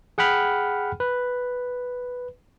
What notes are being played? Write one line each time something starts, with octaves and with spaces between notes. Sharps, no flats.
G#4 F#5 G5 B5 F6
B4